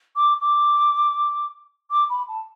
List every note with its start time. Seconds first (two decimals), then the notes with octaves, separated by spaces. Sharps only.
0.16 D6
0.41 D6
1.91 D6
2.09 B5
2.28 A5